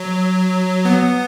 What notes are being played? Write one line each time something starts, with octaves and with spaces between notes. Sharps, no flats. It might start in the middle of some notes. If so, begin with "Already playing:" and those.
Already playing: F#3
B3